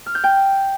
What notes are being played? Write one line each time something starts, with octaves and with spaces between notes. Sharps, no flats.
F6
G6
G5